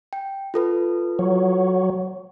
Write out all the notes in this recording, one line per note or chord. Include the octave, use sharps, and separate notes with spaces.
G5
F4 A4 B4
F#3